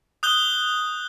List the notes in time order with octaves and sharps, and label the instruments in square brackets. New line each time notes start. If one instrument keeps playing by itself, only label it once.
[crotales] D#6 F#6 G6 G7